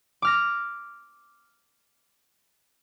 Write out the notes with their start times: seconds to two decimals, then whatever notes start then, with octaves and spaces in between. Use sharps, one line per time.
0.22 D6 F6 A#6